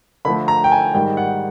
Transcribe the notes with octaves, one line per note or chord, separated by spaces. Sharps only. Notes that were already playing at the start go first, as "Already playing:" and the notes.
D3 F3 A3 B5
A#5
G5
G#5
G#2 D#3 G3 G5
F#5